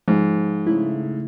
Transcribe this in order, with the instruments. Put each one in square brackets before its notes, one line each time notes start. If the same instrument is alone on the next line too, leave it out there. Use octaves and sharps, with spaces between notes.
[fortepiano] G#2 [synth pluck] F3
[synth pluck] C#3 A3 E4